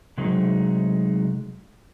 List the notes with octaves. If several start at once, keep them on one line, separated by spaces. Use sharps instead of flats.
C3 F#3 G#3 A3 D#4